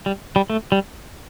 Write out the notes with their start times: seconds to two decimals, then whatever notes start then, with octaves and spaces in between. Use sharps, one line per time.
0.06 G3
0.36 G3
0.50 A3
0.72 G3